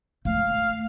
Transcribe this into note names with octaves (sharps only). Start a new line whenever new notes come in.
A3 F5